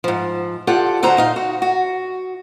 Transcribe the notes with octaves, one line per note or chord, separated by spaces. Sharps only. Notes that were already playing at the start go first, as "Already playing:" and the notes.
G#2 F3
F4 G4 A4 D5 F#5
D3 D#4 F#4 C5 A#5
A#2 D#4 F5
F#4
F#4